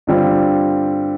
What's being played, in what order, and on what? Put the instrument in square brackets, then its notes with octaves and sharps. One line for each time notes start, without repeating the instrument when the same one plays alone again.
[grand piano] G2 D3 G3 C4 F4